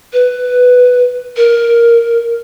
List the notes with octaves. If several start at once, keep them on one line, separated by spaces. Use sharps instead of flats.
B4
A#4